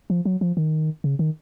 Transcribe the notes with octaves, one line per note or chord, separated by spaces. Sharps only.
F3
F#3
F3
D#3
C#3
D#3